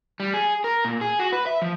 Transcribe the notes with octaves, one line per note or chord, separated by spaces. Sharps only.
G3
G#4
A#4
A#2
G#4
F#4
B4
E5
F3